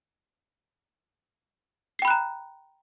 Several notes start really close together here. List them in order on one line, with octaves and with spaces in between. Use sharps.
C7 G5 B5 F#6 A#5